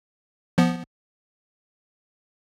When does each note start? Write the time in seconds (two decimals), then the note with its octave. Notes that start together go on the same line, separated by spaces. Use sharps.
0.58 F3 B3